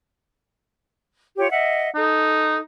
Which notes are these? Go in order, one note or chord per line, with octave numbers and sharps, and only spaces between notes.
F4 G4 C#5
D#5 E5 F#5
D#4 A4